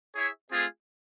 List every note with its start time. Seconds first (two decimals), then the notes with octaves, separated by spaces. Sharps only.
0.13 E4 G#4 C#5 E5
0.51 A3 C4 F4 G#4